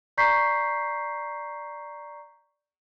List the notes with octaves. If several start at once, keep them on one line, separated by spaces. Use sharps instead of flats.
D5 A#5 C#6 G6 B6 C7